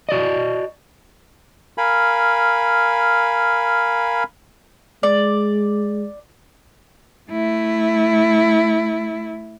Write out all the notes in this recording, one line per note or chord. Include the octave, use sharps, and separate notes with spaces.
F#4 D5 D#5
A#4 F5 G#5 B5
G#3 D5
A3 E4